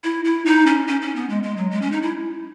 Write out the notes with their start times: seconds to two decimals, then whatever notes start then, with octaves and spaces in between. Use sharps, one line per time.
0.04 E4
0.25 E4
0.46 D#4
0.67 C#4
0.88 C#4
1.02 C#4
1.16 B3
1.29 G#3
1.43 G#3
1.57 F#3
1.71 G#3
1.82 C#4
1.92 D#4
2.02 E4